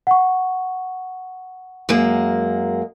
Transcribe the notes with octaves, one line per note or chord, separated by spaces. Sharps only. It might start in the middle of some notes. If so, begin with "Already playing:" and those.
F#5 C#6
F#2 G#3 A#3